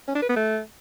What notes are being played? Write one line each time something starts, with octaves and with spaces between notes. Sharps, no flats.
C#4
D4
B4
B3
A3